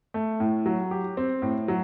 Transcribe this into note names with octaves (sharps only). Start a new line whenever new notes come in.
A3
A2
F#3
G4
C4
A2
F#3